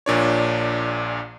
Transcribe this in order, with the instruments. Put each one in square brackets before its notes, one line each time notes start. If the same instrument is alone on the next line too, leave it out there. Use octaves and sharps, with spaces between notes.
[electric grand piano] A#1 A#2 D4 C#5